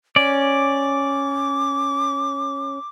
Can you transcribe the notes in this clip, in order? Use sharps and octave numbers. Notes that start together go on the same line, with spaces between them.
C#4 D5 D6